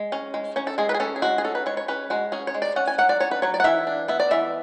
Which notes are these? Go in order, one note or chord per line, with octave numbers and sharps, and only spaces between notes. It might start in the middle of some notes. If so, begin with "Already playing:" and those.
Already playing: G#3
C#4
G#3
C#4 C#5
A4
G#3 G#4
B4
G#4
C#4 A4
G#4
G#3 F#4
G#4
C#4 A4
B4
G#3 C#5
C#5
C#4 B4
G#3 F#4
C#4 G#4
C#5
G#3
D5
C#4 F#5
G#5
F#3 F#5
D5
C#4 C#5
B4
F#3 C#5
D5
F#5
E3 E5
D4
B3 E5
D5
E3 E5